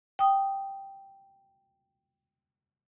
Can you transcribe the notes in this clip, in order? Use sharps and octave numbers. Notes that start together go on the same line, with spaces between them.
G5 D#6